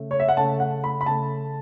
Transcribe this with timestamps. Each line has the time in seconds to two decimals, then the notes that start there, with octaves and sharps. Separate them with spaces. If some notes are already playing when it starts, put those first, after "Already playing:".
Already playing: C#3 A3
0.11 C#5
0.20 E5
0.29 F#5
0.37 C#3 A3 A5
0.60 F#5
0.84 B5
1.01 B5
1.06 C#3 A3 A5